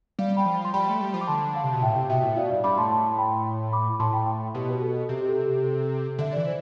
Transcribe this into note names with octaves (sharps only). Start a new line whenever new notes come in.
G3 D5 F5
G5 B5
F3
C6
G3 G5 B5
A3
G3
F3
D6
D3 A5 C6
F5 A5
C3
B2 A5
A2 E5 G5
C3
B2 E5 G5
A2 E5
B2 D5 F5
G2 D5 F5
G2 B5 D6
A2 A5 C6
A5 C6
C6
G5 B5
B5 D6
A2 A5 C6
G5 B5
B2 G4
B4
A4
C3 G4
G4
A4
G4
A4
D3 E5
E3 D5
C5